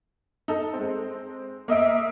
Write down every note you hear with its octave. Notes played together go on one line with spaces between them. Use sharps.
D#4 A4
G#3 C4
A#3 D#5 E5 D7